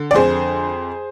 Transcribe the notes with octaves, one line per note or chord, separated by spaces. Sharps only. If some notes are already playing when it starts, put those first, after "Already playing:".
Already playing: D3
D5
F2 G#4 C5